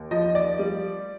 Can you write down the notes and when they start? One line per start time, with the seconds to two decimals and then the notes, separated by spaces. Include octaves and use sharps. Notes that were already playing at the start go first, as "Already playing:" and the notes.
Already playing: D#2
0.11 F3 D#5
0.35 D5
0.59 G3